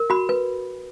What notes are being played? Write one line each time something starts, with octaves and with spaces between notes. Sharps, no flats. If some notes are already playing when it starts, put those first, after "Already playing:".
Already playing: A#4
F#4 B5
B4